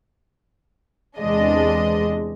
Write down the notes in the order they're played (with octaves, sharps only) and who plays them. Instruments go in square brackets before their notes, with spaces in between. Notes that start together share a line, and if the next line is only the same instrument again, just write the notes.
[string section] E2 C3 G#3 D4 D#5